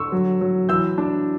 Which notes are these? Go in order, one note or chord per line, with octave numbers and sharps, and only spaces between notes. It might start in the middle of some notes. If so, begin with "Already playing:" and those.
Already playing: D3 C#6 E6
F#3
F#3
E3 E6 G6
D4